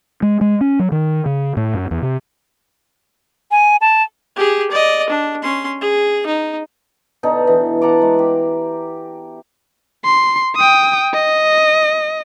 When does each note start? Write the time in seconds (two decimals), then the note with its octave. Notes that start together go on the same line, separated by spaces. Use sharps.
0.22 G#3
0.41 G#3
0.61 C#4
0.79 F#3
0.92 D#3
1.26 C#3
1.57 A2
1.74 F#2
1.91 E2
2.02 C3
3.51 G#5
3.81 A5
4.36 G4 G#4
4.71 D5 D#5
5.10 D4
5.42 C#4 C6
5.81 G#4
6.26 D#4
7.23 B2 D3 D#4 A4
7.47 E3
7.82 F#5 A5 A#5 D6
8.02 G#3
8.19 G4
10.05 C6
10.56 G5 D#6
11.13 D#5